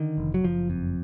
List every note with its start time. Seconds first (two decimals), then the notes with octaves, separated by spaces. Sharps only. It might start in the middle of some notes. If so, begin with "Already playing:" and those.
Already playing: D3 D#3
0.18 F1
0.34 F#3
0.44 F#1 F3
0.70 F2